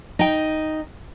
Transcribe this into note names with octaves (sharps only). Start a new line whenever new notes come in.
D#4 G5